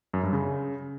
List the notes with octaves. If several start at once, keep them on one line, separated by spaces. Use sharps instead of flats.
F#2
G2
C#3